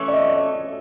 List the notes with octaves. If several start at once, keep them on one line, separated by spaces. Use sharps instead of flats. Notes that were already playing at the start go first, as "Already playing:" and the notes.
Already playing: E3 A3 C#4 E5
D5
D#5